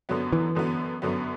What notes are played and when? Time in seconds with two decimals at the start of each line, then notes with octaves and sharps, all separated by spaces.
0.09 F#2 D3 F#3 B3
0.33 E3
0.55 F#2 D3 F#3 B3
1.02 F#2 D3 F#3 B3